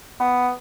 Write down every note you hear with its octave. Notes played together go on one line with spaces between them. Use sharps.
B3